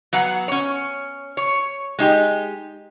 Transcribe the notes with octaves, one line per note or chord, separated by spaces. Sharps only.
F#3 B3 F#5
C#4 C#5
C#5
G#3 D#4 G4